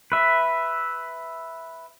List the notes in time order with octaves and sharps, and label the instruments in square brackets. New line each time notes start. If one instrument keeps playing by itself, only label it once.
[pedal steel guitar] B4 E5